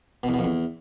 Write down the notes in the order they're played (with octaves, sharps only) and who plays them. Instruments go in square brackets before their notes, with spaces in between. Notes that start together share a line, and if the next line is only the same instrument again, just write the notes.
[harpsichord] B2
E2
B2
F2
E2